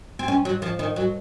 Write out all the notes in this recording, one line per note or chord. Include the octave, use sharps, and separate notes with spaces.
C4
C#4
F#3
F3
D#3
F#3